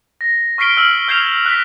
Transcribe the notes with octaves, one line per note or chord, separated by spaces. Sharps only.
A#6
C#6 F6 B6 C7 D7 G7
E6 F6 F#7
F6 G6 G#6 C7 E7 F7
F#6 B6